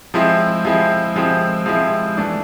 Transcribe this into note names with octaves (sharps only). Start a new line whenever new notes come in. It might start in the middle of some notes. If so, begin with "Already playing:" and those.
F3 G#3 C4 E4
F3 G#3 C4 E4
F3 G#3 C4 E4
F3 G#3 C4 E4
E3 A3 D4